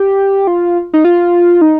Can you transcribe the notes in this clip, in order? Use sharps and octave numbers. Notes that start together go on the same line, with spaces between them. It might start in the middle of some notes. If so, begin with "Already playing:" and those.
Already playing: G4
F4
D#4
F4
D#4